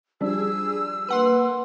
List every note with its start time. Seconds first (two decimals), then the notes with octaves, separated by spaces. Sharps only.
0.20 F3 G3 D4 G#4 E6
1.08 A#3 B4 F#5 C6